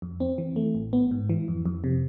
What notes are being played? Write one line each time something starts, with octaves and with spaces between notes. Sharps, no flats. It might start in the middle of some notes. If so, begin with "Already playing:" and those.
F2
C4
E3
A3
A1
B3
G#2
E3
F2
F2
C3